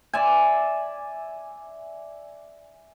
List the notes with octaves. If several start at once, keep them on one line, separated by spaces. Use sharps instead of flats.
D5 E5 G#5